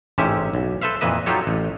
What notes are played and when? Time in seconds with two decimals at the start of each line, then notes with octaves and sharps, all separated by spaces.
0.18 A1 G#2 C3 C#4 G4 E5
0.53 B1
0.81 A4 B4 C5 E5 F5
1.01 F2 A#2 E3 B4 D#5 E5
1.26 F#3 D#4 F4 G4 A4 C#5
1.47 A1